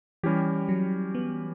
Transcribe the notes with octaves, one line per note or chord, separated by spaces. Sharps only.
E3 G3 C#4 G4
F#3
B3